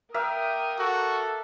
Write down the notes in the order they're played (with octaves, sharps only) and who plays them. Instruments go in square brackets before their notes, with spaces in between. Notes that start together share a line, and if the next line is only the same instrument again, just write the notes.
[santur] A#3 E5 [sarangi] A#4 [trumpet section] G5 D#6
[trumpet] F#4 [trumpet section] A4